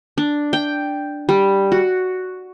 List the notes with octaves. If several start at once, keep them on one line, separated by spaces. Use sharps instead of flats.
D4
G5
G3
F#4